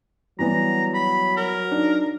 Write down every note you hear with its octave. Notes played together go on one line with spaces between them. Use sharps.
E3 F#3 G3 B3 A#5
B5
A#4
D4 D#4